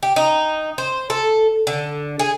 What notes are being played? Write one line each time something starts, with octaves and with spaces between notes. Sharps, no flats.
G4
D#4
C5
A4
D3
G#4